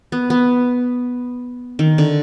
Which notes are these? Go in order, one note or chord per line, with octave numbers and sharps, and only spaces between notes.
B3
B3
D#3
D3